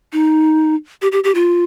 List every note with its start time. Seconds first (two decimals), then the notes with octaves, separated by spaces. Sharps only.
0.13 D#4
1.02 G4
1.12 G4
1.24 G4
1.35 F4